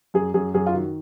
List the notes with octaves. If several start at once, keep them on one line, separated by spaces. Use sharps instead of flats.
F#2 G#4
F#2 G#4
F#2 G#4
F4
D#3 F#4